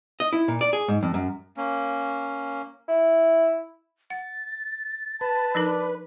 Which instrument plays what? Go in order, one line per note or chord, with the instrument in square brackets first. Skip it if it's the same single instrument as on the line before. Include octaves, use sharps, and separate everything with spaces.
[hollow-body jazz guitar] D#5
E4
A#2
D5
G#4
G#2
F2
F#2
[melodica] A#3 C#4
[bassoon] E4
[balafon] F#5 [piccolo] A6
[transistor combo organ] B4 [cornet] A5
[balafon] F3 D#4 A#4 [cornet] D4